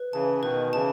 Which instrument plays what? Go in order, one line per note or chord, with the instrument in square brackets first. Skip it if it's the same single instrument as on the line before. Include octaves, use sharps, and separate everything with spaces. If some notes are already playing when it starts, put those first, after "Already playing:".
Already playing: [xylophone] B4
[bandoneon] C#3 E3 [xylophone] A5
[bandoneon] B2 D#3 [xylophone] B4
[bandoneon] C#3 E3 [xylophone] A5